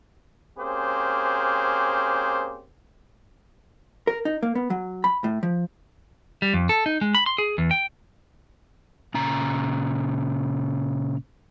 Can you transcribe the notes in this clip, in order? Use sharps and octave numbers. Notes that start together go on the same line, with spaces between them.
A#3 C4 C#4 G4 G#4 C5
A#4
D#4
A#3
B3
F#3
B5
A2
F3
G3
F2
A4
D#4
G#3
B5
C6
G#4
E2
G5
A#2 C#3 A#5